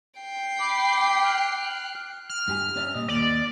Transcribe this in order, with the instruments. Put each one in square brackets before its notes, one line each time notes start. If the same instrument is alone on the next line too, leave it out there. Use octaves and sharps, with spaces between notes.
[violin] G5 C7
[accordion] B5 D6
F6 F#6
[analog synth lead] F6
[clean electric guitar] G2 G4 G#5
C#4 D5 E5
A#2 G3 D#5
[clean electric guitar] D#2 A#3 [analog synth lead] D5